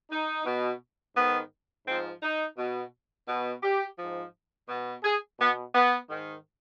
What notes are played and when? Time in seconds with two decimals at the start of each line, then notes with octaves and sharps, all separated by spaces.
0.10 D#4
0.45 B2
1.15 G#2 D#3 B3
1.86 G#2 F3 C4
2.22 D#4
2.56 B2
3.27 B2
3.62 G4
3.97 G#2 F3
4.68 B2
5.03 G#4
5.38 B2 B3
5.73 B3
6.09 G#2 D#3